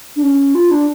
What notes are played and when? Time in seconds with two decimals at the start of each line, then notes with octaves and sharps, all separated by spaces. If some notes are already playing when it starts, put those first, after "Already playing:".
0.16 D4
0.23 C#4
0.55 F4
0.71 D4